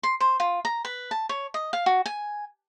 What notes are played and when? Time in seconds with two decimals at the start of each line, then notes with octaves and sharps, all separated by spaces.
0.03 C6
0.20 C5
0.40 F4
0.65 A#5
0.85 B4
1.11 A5
1.29 C#5
1.54 D#5
1.73 F5
1.86 F#4
2.06 G#5